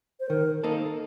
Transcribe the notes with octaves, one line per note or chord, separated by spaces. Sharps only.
C5
D#3 A#4
A#3 D#4 A4